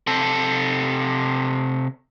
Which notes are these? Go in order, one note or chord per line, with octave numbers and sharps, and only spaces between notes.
C3 A4